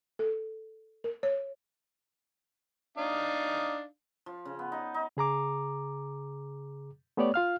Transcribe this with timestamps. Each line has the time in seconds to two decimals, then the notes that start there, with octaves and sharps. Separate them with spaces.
0.19 A4
1.04 A#4
1.23 C#5
2.98 D4 D#4 F5
4.26 F3
4.45 C#3
4.59 B3
4.72 D#4
4.94 D#4
5.17 C#3 G#4 A#5 D6
7.17 A3 B3 G4 C#5 D5
7.34 F4 F5 F6